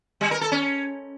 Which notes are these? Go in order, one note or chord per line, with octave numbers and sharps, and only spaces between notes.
G3
A#4
A4
C#4